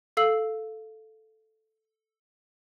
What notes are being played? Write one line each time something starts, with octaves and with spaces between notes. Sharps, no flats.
A4 F5 E6 C7 F#7